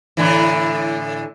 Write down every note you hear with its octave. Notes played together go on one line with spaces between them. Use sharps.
A2 D3 E3